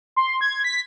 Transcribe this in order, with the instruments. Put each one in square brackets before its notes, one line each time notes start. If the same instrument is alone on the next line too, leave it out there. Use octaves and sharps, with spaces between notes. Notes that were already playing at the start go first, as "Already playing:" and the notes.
[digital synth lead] C6
G#6
B6